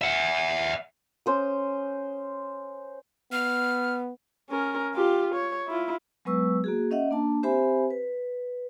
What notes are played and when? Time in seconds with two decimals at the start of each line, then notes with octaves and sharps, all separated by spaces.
0.02 E5 F#5
1.26 C#4 C5 D#6
3.32 B3 F6
4.50 C#4 A#4
4.95 F4 G4
5.35 C#5
5.68 E4 F4
6.25 F#3 G#3 B3 B4 C#6 E6
6.64 A#3 F#4 G#4
6.91 C#4 D#5 E5 F#5
7.11 A#3 D4 A5
7.43 C4 G4 C5 E5 G#5 B5
7.90 B4